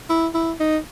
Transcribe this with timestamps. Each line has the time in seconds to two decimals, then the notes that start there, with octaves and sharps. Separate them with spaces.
0.09 E4
0.34 E4
0.60 D#4